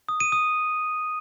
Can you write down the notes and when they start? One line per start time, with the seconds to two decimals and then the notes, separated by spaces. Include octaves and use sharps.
0.09 D#6
0.20 D#7
0.32 D#6